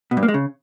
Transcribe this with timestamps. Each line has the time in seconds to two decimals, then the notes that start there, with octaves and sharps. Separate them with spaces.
0.11 B2
0.17 G2
0.23 A#3
0.28 G#3
0.34 C#3